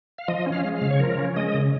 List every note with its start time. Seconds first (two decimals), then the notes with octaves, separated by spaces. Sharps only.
0.18 F5
0.28 F3 D#5
0.46 C#4
0.52 F5
0.64 G#3
0.76 F5
0.82 C#3
0.91 C#5
1.00 F3 A#4
1.18 C#4
1.36 G#3 D#5
1.54 C#3